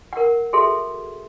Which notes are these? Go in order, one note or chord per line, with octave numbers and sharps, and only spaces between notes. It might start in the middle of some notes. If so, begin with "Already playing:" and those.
A#4 F#5
F#4 G#4 A4 E5 C6